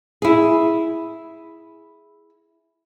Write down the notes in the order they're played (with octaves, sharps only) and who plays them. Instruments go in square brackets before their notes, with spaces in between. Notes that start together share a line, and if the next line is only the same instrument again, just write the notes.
[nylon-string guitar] E4 G#4